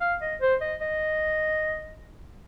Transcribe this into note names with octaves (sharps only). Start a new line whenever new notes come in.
F5
D#5
C5
D#5
D#5